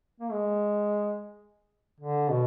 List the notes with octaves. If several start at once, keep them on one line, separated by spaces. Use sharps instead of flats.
A#3
G#3
D3
B2